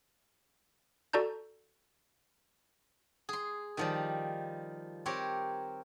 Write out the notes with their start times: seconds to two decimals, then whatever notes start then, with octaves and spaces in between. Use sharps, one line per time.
1.13 F#4 A4 D5 A5 A#5 G6
3.29 G#4 C6
3.77 D#3 F3 G3
5.06 C4 G4 A#4 C#5